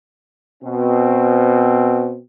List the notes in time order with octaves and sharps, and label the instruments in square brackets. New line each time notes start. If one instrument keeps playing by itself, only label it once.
[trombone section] B2 C4